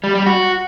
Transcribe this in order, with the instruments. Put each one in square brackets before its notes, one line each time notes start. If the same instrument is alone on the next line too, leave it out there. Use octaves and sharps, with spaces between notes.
[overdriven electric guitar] G3
G3
F#4